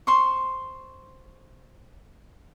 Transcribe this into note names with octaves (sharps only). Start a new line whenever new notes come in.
C5 C6 C#6